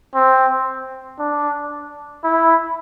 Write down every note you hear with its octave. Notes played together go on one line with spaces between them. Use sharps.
C4
D4
E4